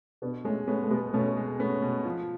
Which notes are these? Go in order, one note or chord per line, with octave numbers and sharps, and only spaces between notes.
B2 B3 D4
G#3 A3 C#4
A3 B3 C#4
A3
B2 G#3 B3
B2 A3 C#4
G#3
A3 B3 C#4
B2
F3